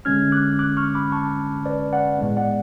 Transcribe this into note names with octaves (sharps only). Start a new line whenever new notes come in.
D3 G#3 C#4 F6 G#6
D6 F#6
D6 F#6
C#6 F6
B5 D6
A5 C#6
B4 D5
D5 F#5
A2 G#3 B3
D5 F#5